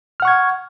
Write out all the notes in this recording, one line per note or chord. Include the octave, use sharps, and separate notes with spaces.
F#5 C#6 F6 G#6